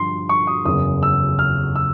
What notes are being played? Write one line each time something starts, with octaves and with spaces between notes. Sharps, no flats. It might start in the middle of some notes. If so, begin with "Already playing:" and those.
Already playing: G2 D3 F3 C6
C#6
D#6
F#1 E2 C#3 D#6
E6
F6
E6